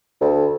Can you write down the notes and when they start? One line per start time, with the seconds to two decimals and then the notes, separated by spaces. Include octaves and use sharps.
0.21 D2